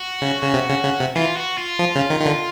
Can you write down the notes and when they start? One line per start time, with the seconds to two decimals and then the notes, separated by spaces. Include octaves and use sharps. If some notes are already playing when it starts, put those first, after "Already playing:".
Already playing: F#4
0.22 C#3
0.43 C#3
0.54 C3
0.69 C#3
0.84 C#3
1.00 C3
1.16 E3 F4
1.37 F#4
1.58 F4
1.79 F3
1.95 C#3
2.10 D#3
2.20 D#3
2.26 D3